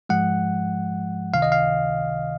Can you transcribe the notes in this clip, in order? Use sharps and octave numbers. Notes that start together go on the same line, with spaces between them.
G#2 F3 G#3 F#5
C#2 C3 D#3 F5
D#5
F5